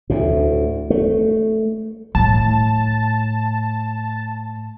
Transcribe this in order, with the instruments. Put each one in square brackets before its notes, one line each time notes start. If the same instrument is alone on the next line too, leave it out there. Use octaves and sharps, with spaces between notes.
[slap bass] D2 A2
A3
[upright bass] A2 [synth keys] A5